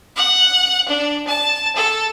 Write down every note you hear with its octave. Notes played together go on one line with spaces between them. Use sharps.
F#5
D4
A5
A4